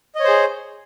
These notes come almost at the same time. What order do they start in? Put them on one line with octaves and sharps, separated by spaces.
D#5 C#5 C5 G#4